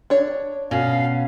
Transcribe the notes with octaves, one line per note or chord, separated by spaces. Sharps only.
D4 C#5
B2 C#4 F5